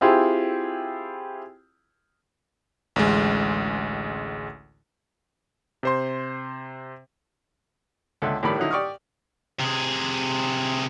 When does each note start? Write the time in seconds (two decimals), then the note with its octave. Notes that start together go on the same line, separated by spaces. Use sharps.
0.01 C4 E4 F4 G4 G#4
2.96 A1 D2 G#3
5.83 C3 C5 C6
8.22 C#2 D3 A4 E5
8.43 A2 D#3 G3 D5 B5
8.58 D3 F#3 C#4 D#4 E4
8.71 G4 D5 C#6 D#6 F6
9.60 C3 G#4